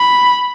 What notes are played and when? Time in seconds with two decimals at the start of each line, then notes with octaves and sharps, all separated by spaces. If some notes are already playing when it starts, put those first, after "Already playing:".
Already playing: B5